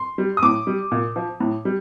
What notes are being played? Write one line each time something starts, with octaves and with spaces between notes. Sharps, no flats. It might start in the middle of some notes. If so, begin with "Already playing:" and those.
Already playing: C6
G3
D#6
A2 D6
G3
A#2
F3
A2
G3